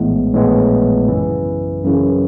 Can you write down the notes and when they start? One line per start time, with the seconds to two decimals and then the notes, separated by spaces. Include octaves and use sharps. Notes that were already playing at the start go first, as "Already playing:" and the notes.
Already playing: A#1 A2 E3 G#3 B3
0.33 A#1 A2 E3 G#3 B3
1.08 F#2 C#3 E3
1.84 F#2 C#3 E3